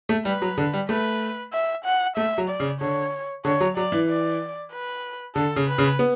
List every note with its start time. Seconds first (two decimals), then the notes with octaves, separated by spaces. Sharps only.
0.09 A3
0.25 G3 B4
0.42 F#3
0.58 D3
0.74 G3
0.89 A3 B4
1.53 E5
1.85 F#5
2.16 A3 E5
2.38 F#3
2.49 D5
2.60 C#3
2.80 D3 C#5
3.45 D3 C#5
3.60 F#3
3.77 F#3 D5
3.92 E3
4.09 D5
4.72 B4
5.35 D3 A4
5.56 C#3
5.68 B4
5.78 C#3
5.99 B3